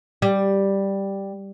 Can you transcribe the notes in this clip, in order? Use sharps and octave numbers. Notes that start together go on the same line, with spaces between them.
G3